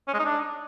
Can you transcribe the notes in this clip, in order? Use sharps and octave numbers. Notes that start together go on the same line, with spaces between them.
C#4
G#3
D#4
D4